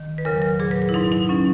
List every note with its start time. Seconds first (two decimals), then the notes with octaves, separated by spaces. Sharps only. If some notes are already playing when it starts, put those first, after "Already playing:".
Already playing: D#3
0.18 B4
0.25 E2 C#3 F#3 A#4
0.42 A#4
0.59 A#2 F#3 G#4
0.71 B4
0.82 B4
0.89 E4
0.94 G#2 F#3 D#4
1.12 D#4
1.29 F#3 C#4